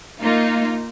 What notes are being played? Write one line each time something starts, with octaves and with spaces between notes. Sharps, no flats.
A#3 D#4 F4